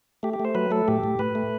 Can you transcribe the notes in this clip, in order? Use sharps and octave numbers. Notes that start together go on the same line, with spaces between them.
A3 G4
G4
A3
C5
F#3 B4
A3 A4
A2 G4
A2
A2 B4
A3